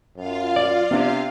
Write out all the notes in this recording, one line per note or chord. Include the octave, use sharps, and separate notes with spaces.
F#2 F4 F5
D5
C3 B3 D4